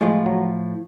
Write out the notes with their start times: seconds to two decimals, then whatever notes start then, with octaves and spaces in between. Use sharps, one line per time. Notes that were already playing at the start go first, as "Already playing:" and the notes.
0.01 A2 F3 G#3 A3 F4
0.26 F#3